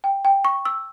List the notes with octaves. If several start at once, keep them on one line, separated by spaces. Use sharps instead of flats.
G5
G5
C#6
E6